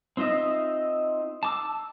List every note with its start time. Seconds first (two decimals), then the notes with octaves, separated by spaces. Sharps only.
0.17 C4 D#4 F4 D#5 E5
1.43 A5 D6 E6